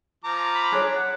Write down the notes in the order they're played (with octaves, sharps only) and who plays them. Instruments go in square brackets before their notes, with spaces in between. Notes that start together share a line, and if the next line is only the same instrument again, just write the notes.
[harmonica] F3 A#5 D6
[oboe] B5
[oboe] D4 [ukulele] G#4 C#5
[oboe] F#5